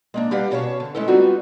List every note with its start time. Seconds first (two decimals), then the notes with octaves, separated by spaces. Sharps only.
0.14 G#3 A#3 D4
0.31 G3 D4 G4 B4 F5 F#5
0.51 B2 C#4 C#5 F5 A5
0.80 D3
0.95 G#3 A3 C#4 E4 A4
1.08 G3 B3 C4 D#4 F4 F#4